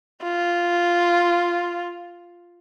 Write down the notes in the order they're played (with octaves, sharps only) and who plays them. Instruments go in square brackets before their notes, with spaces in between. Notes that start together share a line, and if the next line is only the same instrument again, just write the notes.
[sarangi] F4